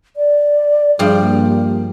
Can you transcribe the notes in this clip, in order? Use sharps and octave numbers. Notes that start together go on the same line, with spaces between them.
D5
G2 F3 G3 G#4
A#3